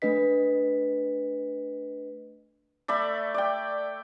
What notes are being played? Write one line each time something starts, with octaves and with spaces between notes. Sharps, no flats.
A3 D4 B4 D#5 B6
A3 D5 E5 B5
D5 G5